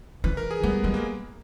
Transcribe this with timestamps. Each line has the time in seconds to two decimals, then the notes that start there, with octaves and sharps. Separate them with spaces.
0.24 E3 B4
0.37 A#4
0.51 G#4
0.63 G3 B3
0.84 G3 G#3
0.94 A#3